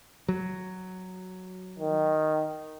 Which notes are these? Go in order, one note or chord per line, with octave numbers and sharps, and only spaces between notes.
F#3
D#3